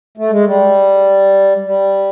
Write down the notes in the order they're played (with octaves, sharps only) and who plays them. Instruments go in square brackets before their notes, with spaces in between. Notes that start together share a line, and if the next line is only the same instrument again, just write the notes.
[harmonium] A3
G#3
G3
G3